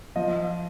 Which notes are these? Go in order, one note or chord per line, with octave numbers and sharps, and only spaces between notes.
F3 D#5